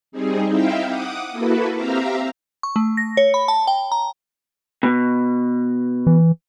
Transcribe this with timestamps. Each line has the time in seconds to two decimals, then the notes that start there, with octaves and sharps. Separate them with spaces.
0.12 G3 C4 D#4 G#4
0.49 C4 D#4 E4 E5 F5 G5
0.86 F#5 D6 D#6
1.31 A#3 E4 F#4 A4 B4
1.75 C4 G4 E5 F5 A#5
2.63 C#6
2.76 A3
2.97 A#6
3.17 C#5
3.34 B5
3.48 A5
3.67 G5
3.92 A#5
4.83 B2
6.07 E3